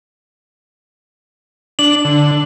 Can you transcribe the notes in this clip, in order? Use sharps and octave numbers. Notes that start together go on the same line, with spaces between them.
D4 F#7
D3